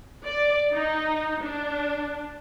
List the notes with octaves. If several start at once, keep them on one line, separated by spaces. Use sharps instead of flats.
D5
D#4
D4